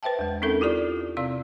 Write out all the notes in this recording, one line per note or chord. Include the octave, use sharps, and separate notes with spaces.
B4 C5 E5 G5 A5
E2 G#3
C4 C#4 D#4 A4 A#4 E5
E4 F4 G4 D5
C3 C4 D5 F5 E6